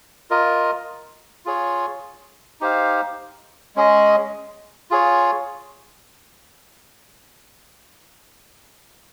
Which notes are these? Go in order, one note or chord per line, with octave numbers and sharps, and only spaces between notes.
F4 A#4 D#5
F4 G#4 C#5
D#4 G4 C5 F5
G#3 C#4 G#4 D#5
F4 G#4 C#5